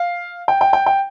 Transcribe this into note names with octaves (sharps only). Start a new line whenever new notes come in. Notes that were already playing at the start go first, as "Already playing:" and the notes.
Already playing: F5
G5
G5
G5
G5